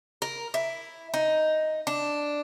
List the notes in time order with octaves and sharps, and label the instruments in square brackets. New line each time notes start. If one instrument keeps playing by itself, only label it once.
[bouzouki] A#4
E4
D#4
D4